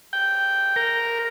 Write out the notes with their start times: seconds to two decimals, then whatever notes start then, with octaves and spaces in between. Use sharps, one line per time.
0.13 G5
0.76 A#4